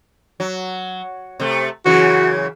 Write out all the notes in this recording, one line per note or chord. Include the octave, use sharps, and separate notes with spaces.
F#3
C3 A3
F#2 C#3 E3 F#4